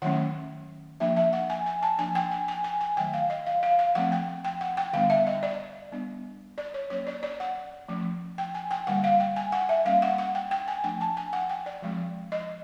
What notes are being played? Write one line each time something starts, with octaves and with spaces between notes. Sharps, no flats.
D#3 F#3 A3 C#4 F#5
F3 A#3 D4 E5
E5
F#5
G#5
G#5
A5
F3 A#3 D4 G#5
G5
G#5
G#5
G#5
G#5
D#3 F#3 A3 G5
F5
D#5
F5
F5
F5
F3 A3 C4 F#5
G5
G5
F#5
G5
D3 G3 B3 D4 F5
E5
D#5
D5
G3 B3 D4
D5
C#5
F#3 A#3 C#4 C#5
D5
D5
F#5
F3 A3 C#4
G5
G#5
G5
D3 G3 A#3 F#5
F5
G5
G#5
F#5
E5
G3 A#3 C#4 F5
F#5
F#5
G5
G5
G#5
F3 A3 D4 G5
A5
G#5
F#5
G5
D5
F3 G#3 C4
D#5